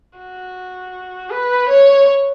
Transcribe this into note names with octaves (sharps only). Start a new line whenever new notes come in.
F#4
B4
C#5